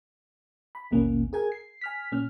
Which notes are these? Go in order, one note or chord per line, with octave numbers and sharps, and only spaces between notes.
B5
A1 D#2 B2 A#3 C#4
G#4 A#4 G#5 G#6
C7
G#5 F6 B6
A#2 C#4 F6